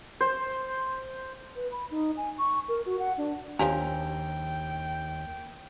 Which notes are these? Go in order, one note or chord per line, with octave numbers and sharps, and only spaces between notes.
C5
B4
B5
D#4
G#5
C#6
A#4
F#4
F#5
D4
D#2 F3 D4 G4 C#5 G5 A#5